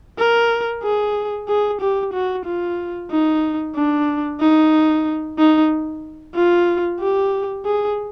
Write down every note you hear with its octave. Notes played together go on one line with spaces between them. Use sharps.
A#4
G#4
G#4
G4
F#4
F4
D#4
D4
D#4
D#4
F4
G4
G#4